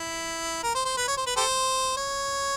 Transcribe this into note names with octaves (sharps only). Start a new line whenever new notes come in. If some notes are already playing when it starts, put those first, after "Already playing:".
Already playing: E4
A#4
C5
C5
B4
C#5
C5
B4
G4 A4 C5
C#5